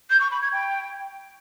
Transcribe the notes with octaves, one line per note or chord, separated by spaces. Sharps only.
G6
C#6
B5
G#6
G5